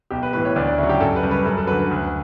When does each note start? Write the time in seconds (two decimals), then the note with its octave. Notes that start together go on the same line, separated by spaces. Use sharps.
0.10 B1 G4
0.23 B4
0.33 A2 E3 B4
0.45 C#5
0.56 D2 D5
0.67 D5
0.78 C#3 E4
0.83 F#3
0.89 G4
1.00 F#2 A4
1.16 B4
1.23 C#3 G3
1.31 B4
1.45 F#2 A4
1.57 A4
1.67 F#3 B4
1.72 D3
1.79 B4
1.91 D2